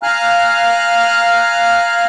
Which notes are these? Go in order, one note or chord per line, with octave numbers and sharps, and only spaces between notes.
F5 G#5 A#5 F6 F#6